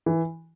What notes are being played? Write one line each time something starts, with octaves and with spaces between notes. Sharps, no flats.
E3